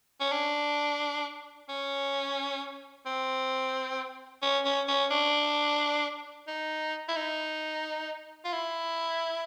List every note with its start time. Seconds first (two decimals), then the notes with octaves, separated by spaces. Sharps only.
0.20 C#4
0.32 D4
1.69 C#4
3.06 C4
4.42 C#4
4.65 C#4
4.88 C#4
5.11 D4
6.47 D#4
7.08 E4
7.16 D#4
8.44 F4
8.53 E4